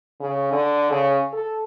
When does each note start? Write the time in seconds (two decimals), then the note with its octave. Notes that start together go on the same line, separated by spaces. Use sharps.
0.20 C#3
0.52 D3
0.91 C#3
1.33 A4